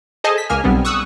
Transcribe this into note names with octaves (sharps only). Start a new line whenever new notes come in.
G#4 A4 C5 D#5 G#5 A5
B6
C#2 A#3 G#5 F6
B1 G3 B3 C4
C#6 D#6 E6 F#6